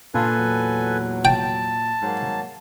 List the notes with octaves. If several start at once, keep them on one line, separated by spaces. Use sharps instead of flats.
A#2 D4 F4 A4 B4 G#5
E2 F#3
G5 A5
G#2 F#3 A#3